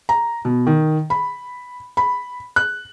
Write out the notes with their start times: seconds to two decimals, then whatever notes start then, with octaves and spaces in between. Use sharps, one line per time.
0.09 A#5
0.45 B2
0.67 D#3
1.10 B5
1.97 B5
2.56 F#6